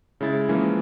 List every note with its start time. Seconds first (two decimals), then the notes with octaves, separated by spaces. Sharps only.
0.21 C#3 G#3 E4 A6
0.49 E3 F3 G#3 A#3 C#4